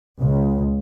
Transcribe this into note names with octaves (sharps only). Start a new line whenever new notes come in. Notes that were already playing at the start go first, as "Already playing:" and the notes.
C#2